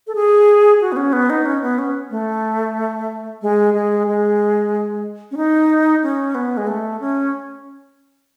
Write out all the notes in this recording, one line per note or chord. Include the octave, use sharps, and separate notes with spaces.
A4
G#4
F#4
B3
C#4
B3
D#4
C#4
B3
C#4
A3
G#3
G#3
G#3
C#4
D#4
C#4
B3
G#3
A3
C#4